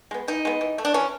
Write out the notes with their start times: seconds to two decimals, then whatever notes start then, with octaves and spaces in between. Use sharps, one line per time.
0.11 G#3 B3
0.28 E3 D#4
0.45 G#3 B3
0.61 E3
0.78 A3
0.85 D4
0.94 E3 C#4